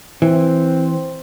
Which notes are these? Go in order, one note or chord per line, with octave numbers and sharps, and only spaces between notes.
E3 C4